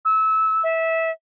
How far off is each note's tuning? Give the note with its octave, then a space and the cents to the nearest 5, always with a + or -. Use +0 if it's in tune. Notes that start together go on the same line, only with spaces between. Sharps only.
E6 -25
E5 -15